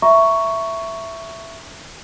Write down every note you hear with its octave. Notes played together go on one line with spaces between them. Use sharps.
E5 A#5 C#6